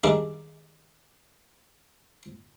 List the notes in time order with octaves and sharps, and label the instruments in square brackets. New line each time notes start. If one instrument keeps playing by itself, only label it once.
[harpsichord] D#3 G3 G#3 D4